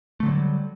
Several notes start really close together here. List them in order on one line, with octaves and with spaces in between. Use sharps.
A3 D3 F#3 G3